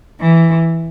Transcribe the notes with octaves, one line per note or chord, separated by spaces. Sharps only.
E3